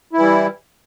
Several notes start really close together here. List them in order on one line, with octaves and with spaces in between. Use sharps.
E4 E3 G3